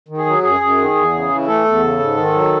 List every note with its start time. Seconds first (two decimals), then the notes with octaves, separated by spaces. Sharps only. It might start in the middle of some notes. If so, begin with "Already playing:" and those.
0.09 D#3
0.18 G#4
0.26 F#3
0.43 F#2 G#4
0.60 F#2
0.78 D#3
0.95 E2
1.13 C#3
1.29 E3
1.47 A3 A4
1.65 E2
1.82 C#3
1.99 G#2
2.17 D#3
2.34 F#3